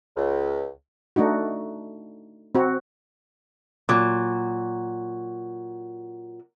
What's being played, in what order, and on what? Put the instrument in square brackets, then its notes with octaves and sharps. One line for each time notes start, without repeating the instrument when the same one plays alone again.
[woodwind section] C#2
[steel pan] A3 D4 D#4 F#4
C4 F#4
[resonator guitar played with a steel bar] A#2 F#3